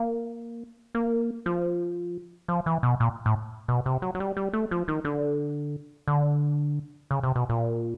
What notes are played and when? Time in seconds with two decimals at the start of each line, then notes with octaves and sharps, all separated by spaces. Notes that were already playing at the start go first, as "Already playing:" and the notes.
Already playing: A#3
0.95 A#3
1.46 F3
2.48 F3
2.66 E3
2.83 B2
3.00 A#2
3.26 A2
3.68 B2
3.86 C3
4.02 F#3
4.15 F#3
4.20 G3
4.37 G3
4.53 A3
4.71 F3
4.88 D#3
5.05 D3
6.08 D3
7.11 C#3
7.23 C3
7.36 B2
7.49 A#2